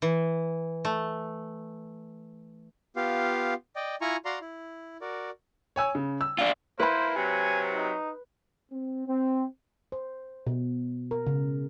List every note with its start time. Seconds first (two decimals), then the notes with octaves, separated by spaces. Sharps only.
0.02 E3
0.85 A3
2.96 B3 F4 G4 F5
3.76 D5 D#5 G5
4.01 E4 F4 G#5 A#5 C#6
4.25 F#4 D5 F5 A#5 C6
4.41 E4
5.01 F#4 A#4 D5
5.76 C#5 G#5 E6
5.95 C#3
6.21 E6
6.39 D4 F4
6.80 A#3 E4 B4 C5 B5
7.16 C3 F#3 G#5
7.74 D#4
8.71 C4
9.07 C4
9.92 C5
10.47 B2
11.11 A#4
11.27 C#3